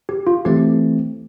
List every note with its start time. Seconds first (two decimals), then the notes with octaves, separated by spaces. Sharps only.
0.09 G4
0.27 F4
0.45 E3 A3 C4 G4